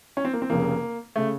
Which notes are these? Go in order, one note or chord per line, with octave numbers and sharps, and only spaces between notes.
C#4
C4
A#3
C4
F1 F2 C#3 A#3
C#3 A3